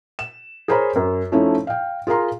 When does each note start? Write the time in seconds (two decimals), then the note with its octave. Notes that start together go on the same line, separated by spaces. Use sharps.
0.19 E7
0.68 G#4 A#4 C5 C#5 A#5 B5
0.96 F#2
1.32 F3 A3 C#4 D#4 E4
1.67 F5 G5
2.07 F4 G#4 A#4 A#5 C6